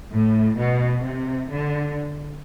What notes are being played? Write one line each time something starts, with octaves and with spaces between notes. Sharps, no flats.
A2
B2
C3
D3